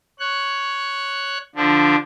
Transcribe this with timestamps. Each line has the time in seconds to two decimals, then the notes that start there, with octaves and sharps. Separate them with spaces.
0.19 C#5 F#6
1.55 D3 F3 D4